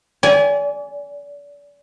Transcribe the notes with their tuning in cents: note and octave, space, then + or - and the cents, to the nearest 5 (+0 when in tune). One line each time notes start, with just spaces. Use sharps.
D5 -35 G#5 +0